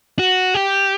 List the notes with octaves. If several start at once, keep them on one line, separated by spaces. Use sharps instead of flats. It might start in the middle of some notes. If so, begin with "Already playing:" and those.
F#4
G4